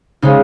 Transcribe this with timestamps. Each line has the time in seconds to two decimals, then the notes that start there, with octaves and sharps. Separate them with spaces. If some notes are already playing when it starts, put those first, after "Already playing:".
0.22 C#3 G#3 D#4